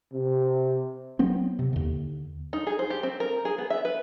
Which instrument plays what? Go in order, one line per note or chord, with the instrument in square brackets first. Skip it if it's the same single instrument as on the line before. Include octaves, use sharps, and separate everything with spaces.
[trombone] C3
[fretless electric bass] F#3 B3 C4
C3
D#2 D3
[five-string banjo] D#4
G#4
C5
G4
C4
A#4
G#4
B3
E5
B4